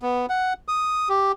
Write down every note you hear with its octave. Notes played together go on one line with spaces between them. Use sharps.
B3
F#5
D#6
G4